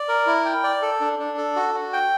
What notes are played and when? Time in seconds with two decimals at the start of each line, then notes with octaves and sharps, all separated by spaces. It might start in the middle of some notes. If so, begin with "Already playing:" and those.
Already playing: D5
0.08 A#4
0.27 E4
0.45 G5
0.64 D5
0.82 A4
1.00 D4
1.19 D4
1.37 A4
1.56 F#4
1.74 F#4
1.93 G5